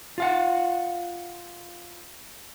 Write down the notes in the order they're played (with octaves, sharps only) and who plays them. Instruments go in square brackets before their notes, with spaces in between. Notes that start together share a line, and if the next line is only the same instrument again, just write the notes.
[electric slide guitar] F4 F5 F#5